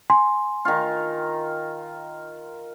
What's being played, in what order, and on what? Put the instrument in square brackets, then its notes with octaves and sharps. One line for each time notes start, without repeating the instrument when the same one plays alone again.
[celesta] G#5 C6
[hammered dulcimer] D#3 F4